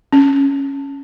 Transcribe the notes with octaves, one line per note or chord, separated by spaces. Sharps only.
C#4